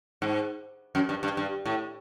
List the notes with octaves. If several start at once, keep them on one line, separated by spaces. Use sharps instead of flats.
G#2
F#2
G2
G2
G2
A2